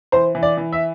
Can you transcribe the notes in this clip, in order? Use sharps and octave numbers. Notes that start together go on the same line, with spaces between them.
E3 C5
E3
D5
E3
E5